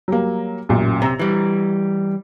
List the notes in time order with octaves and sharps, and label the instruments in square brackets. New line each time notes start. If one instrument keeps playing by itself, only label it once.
[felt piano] F#3 G3 A#3
A1 F#2 A#2
[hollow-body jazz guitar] C3 [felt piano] A#5 E6
[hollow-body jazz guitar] E3 G3